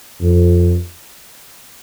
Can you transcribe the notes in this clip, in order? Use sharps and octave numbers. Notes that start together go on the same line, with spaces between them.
F2